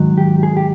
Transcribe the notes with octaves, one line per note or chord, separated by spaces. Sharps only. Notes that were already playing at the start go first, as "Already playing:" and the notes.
Already playing: G#2 D#3 F#3
G4
G#4
G4